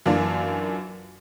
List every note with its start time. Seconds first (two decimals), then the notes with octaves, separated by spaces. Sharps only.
0.06 F#2 E3 A#3 D4 F4